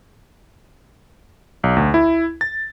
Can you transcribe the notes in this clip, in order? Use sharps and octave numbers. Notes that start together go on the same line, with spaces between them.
B1
D2
E4
A6